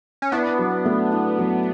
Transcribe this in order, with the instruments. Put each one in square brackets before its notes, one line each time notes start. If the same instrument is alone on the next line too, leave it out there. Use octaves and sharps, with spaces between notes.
[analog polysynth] C#4
[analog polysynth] B3 D4 [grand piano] E4
[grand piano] F#3
A3
E4
F#3